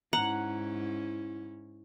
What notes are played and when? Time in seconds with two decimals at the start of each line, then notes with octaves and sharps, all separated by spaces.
0.13 G#2 C#4 E4 F#5 A#5